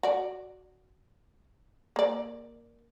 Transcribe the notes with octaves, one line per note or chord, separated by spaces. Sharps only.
F#4 D5
A#3 D5